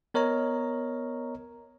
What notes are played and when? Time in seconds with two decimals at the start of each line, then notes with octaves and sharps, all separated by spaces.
0.14 B3 A#4 C#5 D#5 A#5